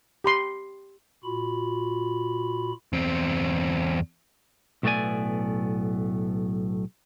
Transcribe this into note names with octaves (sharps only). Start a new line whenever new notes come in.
G4 B5 C6
A#2 F4 F#4 B5
E2 C4
B1 A2 A3 B3 D5 G#5